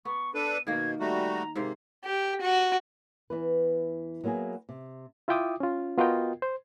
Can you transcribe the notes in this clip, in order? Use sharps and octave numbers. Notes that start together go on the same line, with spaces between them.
B3 C#6
D4 A4 B4 D#7
B2 D#3 A#3 G#6
G3 A3 F#4 A#5
G#2 C3 A#3 C5
G4
F#4
E2 A2 E3 B4
F#3 A#3 B3 E4 G#4
C3
E4 F4 E5 G5 D6 D#6
C#4 F4
B3 F4 F#4 A#4 D#5 G5
C5